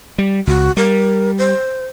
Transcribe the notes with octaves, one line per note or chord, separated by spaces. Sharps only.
G3
C#2 F#4
G3 A#4
C5